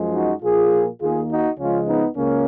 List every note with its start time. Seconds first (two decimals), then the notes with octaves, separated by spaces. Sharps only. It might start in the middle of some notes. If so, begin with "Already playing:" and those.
Already playing: F#2 F3 G#3
0.14 D#4 F#4
0.42 A#2 F3 A#3 F4 G#4
1.00 D#2 D#3 A#3 F4 G#4
1.30 D#4 F#4
1.58 C#2 C#3 F3 G#3 C#4 F4
1.87 B3 D#4
2.16 C#2 C#3 A#3 C#4